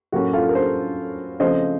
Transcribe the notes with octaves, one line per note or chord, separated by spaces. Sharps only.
A2 F#3 A#3 C#4 F#4
F4 A4
A#4
A4 C5
C#3 F3 A3 C4 C5 D#5